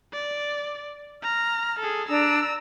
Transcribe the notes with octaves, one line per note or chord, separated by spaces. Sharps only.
D5
A#5 F6
G#4 A4
D4 A#5 E6